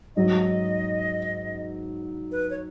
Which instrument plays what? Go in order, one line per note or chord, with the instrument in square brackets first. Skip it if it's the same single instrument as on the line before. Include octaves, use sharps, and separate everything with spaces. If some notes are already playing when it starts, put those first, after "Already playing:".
[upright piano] G#2 F#3 D#4 [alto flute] D#5
[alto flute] B4
C#5